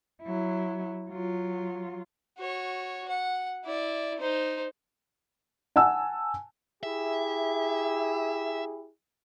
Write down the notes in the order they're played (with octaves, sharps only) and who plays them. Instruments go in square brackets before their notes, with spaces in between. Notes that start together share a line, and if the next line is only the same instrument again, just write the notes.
[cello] F#3 E4
F#3 F4
[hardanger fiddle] F#4 C#5
F#5
E4 D5
D#4 C5
[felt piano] F#5 G#5 A5 E6
[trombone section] E4 G4 G#4 [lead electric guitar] E5